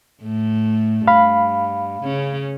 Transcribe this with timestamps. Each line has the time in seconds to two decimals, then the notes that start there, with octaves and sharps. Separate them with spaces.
0.22 A2 A3
1.08 G2 F5 B5
2.03 C#3 C#4